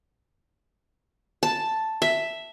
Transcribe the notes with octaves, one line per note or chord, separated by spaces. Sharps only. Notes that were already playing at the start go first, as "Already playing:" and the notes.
A5
E5